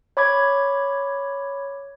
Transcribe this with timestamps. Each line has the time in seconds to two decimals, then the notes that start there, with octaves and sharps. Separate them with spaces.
0.17 C#5 B5 D6 G#6